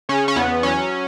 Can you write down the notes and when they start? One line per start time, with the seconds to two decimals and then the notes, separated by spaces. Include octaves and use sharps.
0.09 C#3 C#4
0.28 C#4
0.36 E2 B3
0.63 F#3 C#4